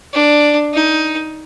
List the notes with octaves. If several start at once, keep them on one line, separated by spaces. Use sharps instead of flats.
D4
D#4